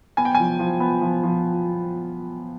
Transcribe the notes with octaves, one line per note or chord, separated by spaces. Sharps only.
B3 G#5
G5
F3 G#5
F3
B3
F3
F3